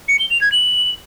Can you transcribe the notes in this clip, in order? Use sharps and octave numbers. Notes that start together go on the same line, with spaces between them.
C#7
G7
F7
G#6
F#7